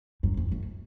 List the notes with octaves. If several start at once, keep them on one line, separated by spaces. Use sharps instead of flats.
F#2
F2
F#2